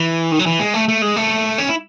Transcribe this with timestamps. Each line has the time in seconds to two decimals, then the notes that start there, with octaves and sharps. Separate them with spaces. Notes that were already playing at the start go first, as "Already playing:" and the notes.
Already playing: E3
0.32 D#3
0.39 F#3
0.46 E3
0.59 G#3
0.74 A3
0.88 A3
1.02 G#3
1.16 A3
1.58 C#4
1.69 E4